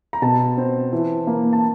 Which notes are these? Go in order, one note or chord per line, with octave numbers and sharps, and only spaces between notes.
A#5
B2 A5
C4
E3
A#3
A5